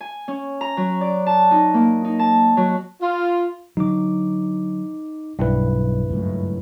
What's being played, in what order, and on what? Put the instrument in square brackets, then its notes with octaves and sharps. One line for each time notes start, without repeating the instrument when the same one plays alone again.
[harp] G#5
C#4
A#5
F#3
D5
A5
D#4
A#3
D#4
A5
F#3
[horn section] F4
[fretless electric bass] D3 F#3 [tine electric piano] D#4 D6
[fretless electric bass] B1 [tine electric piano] G2 E4 B4
[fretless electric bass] C#2 F#2 A2